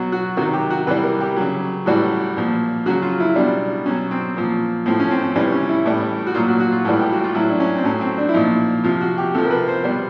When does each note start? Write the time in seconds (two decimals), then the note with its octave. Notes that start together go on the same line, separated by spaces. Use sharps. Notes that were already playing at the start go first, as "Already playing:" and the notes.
Already playing: B2 F#3
0.12 F#4
0.37 C3 D#3 F#3 F#4
0.53 G4
0.70 F#4
0.87 C3 E3 G3 B4
1.03 A#4
1.21 G4
1.37 C#3 F#3
1.86 A2 E3 G3 F#4
2.37 A#2 F3
2.86 C#3 F#3 F#4
3.02 F4
3.20 E4
3.36 B2 G3 D4
3.86 B2 C#4
3.89 F#3
4.11 C4
4.36 A#2 F3
4.86 A2 F3 C4
5.00 C#4
5.11 C4
5.23 C4
5.36 C3 E3 G3 C#4
5.52 C#4
5.69 E4
5.86 A2 E3 G3
6.27 F#4
6.35 A#2 F#3 F4
6.48 F#4
6.60 F#4
6.72 F4
6.85 A2 E3 G3
7.01 G4
7.12 F#4
7.24 F4
7.35 A2 F#3 E4
7.49 D4
7.60 C#4
7.77 C4
7.84 A2 F#3 C#4
8.01 C4
8.18 D4
8.29 E4
8.34 A#2 F3 D#4
8.84 C3 F3 F4
9.01 F#4
9.18 G4
9.34 C3 F3 A4
9.45 A#4
9.51 B4
9.68 C5
9.83 B2 G3